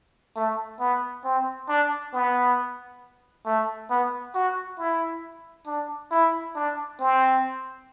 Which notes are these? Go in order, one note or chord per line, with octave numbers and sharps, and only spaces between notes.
A3
B3
C4
D4
B3
A3
B3
F#4
E4
D4
E4
D4
C4